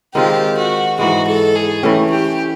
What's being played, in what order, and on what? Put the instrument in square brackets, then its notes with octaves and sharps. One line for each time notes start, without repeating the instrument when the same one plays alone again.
[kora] D#3 G#3 C4 F4 [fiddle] G4
[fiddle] F#4
[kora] G#2 E3 G#3 [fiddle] F#4
[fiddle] A4
G#4
[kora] E3 A3 C#4 [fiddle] G4
[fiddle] G4